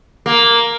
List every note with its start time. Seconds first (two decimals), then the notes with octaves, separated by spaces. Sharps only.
0.26 A#3